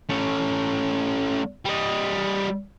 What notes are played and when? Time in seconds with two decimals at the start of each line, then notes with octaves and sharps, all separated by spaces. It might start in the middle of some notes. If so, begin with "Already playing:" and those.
0.09 A3 C#4
1.65 G3 D#5